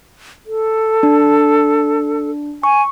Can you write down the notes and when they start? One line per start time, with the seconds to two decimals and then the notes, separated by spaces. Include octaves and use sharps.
0.46 A4
1.03 D4
2.63 G#5 C#6